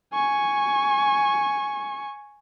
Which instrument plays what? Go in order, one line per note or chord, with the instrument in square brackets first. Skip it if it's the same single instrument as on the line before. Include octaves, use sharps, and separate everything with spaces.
[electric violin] G#5 C#6